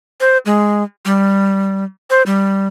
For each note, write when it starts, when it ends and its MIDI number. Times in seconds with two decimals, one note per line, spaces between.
0.20 0.38 72
0.46 0.83 56
1.05 1.84 55
2.10 2.22 72
2.26 2.68 55